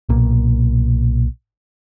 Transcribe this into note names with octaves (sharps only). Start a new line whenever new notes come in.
B1 A#2